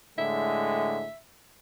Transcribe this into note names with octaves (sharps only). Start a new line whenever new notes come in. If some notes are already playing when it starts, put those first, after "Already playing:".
A2 D3 G#3 E5